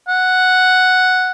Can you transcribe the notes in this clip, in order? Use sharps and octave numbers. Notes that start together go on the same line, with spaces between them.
F#5